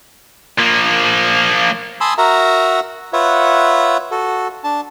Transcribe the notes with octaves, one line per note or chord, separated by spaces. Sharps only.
F3 A#3
G#5 A5 B5 C6 D#6 E6
F#4 A#4 E5 F#5 A#5
F4 B4 C#5 E5 F#5
F#4 A4
D4 A5